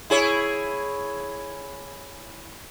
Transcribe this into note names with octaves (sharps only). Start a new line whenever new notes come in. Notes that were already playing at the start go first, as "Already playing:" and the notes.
E4 G#4 C#5